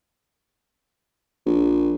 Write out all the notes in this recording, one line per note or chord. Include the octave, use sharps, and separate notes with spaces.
A#1